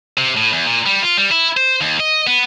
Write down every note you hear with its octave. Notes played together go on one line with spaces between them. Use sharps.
C3
A2
E2
A#2
G3
F4
G3
E4
C5
D#2
D#5
B3